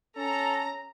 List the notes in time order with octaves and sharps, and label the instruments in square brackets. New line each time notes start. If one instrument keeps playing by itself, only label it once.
[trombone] C#4 [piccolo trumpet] A4 [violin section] A#5